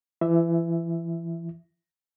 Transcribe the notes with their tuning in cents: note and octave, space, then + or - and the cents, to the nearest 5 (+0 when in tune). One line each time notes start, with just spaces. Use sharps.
E3 +30 E5 +0